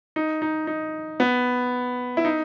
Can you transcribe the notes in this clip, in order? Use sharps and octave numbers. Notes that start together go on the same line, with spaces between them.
D#4
D#4
D#4
B3
E4
D#4